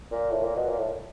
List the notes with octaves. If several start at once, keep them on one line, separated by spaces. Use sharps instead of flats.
A#2
A2
A#2
B2
A#2
A2